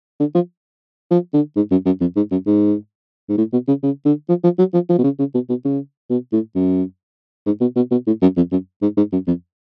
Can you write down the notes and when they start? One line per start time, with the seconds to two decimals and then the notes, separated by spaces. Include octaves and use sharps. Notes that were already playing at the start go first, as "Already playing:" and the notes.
0.20 D3
0.35 F3
1.11 F3
1.34 D3
1.56 G#2
1.71 F#2
1.86 F#2
2.01 F2
2.16 G#2
2.31 F#2
2.46 G#2
3.29 G#2
3.38 A2
3.53 B2
3.68 C#3
3.83 C#3
4.05 D3
4.29 F3
4.44 F3
4.59 F#3
4.74 F3
4.89 F3
4.98 B2
5.04 C#3
5.19 C#3
5.34 B2
5.49 B2
5.65 C#3
6.10 B2
6.32 A2
6.55 F#2
7.46 G#2
7.61 B2
7.76 B2
7.91 B2
8.07 A2
8.22 F#2
8.36 F2
8.52 F#2
8.82 G#2
8.97 G#2
9.13 F#2
9.27 F2